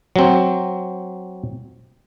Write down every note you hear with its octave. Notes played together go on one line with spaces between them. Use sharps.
F#3 C4